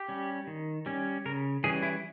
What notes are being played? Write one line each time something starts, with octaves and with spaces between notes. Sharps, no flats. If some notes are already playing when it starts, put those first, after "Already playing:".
Already playing: G4
G3 C#4
D#3
G3 C#4
C#3 A#4
E3 G3 C#4 G#4
E4